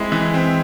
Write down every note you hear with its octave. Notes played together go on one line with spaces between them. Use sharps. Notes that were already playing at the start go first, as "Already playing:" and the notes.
Already playing: G#3 C4 E4
E3
C4